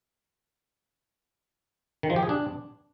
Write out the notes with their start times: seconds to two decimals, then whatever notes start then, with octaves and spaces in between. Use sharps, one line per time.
2.03 D#3
2.10 F3
2.16 G4
2.23 G#4
2.29 D4